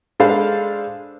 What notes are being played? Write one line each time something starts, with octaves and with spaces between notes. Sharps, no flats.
G#3 D4 A4 C5 F5 B5